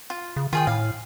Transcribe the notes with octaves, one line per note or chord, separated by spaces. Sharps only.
F4
C#3
D#3 F4 G#4 G5
A2 F5